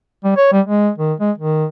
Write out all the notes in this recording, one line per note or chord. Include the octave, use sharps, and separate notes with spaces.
G3
C#5
G3
G#3
D#3
G#3
D#3